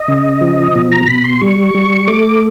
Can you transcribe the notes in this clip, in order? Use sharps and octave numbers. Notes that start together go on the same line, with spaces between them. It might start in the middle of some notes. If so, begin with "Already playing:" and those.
Already playing: D#5
C#3
F3
B2
A#5
B2 B5
C6
G3 C#6
G3
A3 D6